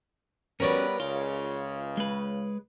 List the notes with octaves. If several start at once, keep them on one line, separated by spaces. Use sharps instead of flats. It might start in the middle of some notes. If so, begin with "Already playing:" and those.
G3 B3 C#4 F#4 A#4 B4 C#5 D5
C#2 C#3 F4
G#3 B4